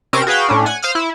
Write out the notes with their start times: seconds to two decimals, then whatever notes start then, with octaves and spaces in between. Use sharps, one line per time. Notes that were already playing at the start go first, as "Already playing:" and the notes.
0.13 C3 C4 C#4 A#4 D7 E7
0.27 F#4 G#4 B4 F5 G5
0.48 A2 C#4 D4
0.66 F#5 G#5
0.82 C5 F5 D#6 F6
0.95 E4